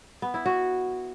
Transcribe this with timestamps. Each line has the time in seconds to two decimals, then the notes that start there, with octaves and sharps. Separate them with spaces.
0.22 B3
0.34 E4
0.46 F#4